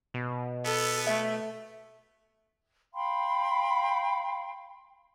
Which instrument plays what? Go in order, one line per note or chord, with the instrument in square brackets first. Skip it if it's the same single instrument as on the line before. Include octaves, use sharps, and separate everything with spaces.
[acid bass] B2
[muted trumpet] B3 [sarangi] A4
[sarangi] A3 [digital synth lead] E5
[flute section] F5 G5 B5 C6